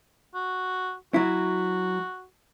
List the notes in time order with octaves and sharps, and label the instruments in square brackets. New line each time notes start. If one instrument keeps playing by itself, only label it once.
[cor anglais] F#4
[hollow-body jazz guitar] F#3 E4 [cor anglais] F#4